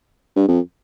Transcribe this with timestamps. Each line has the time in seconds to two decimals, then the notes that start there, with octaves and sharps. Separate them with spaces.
0.36 G2
0.48 F2